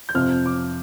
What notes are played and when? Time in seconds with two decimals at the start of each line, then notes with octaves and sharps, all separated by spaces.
0.09 G6
0.15 F2 C3 F3 F6
0.46 D6